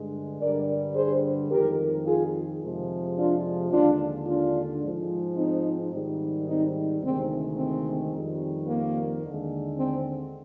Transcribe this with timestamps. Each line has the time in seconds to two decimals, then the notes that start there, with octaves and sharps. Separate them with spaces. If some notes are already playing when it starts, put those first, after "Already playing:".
Already playing: G2 D3 G#3
0.40 G2 D3 G3 A#4 D5
0.95 G#4 C5
1.50 F2 D#3 G#3 G4 A#4
2.05 F4 G#4
2.61 F2 C3 F3 G#3
3.16 D4 F4
3.70 D#2 D3 G#3 D4 F4
4.26 D4 F4
4.82 G#2 F3 G#3
5.36 C4 D#4
5.92 G#2 D#3 G3
6.47 C4 D#4
7.02 D2 C3 D#3 G#3 C4
7.58 C4
8.12 F2 D#3 G3
8.68 A#3
9.23 D#2 D3 G#3
9.78 C4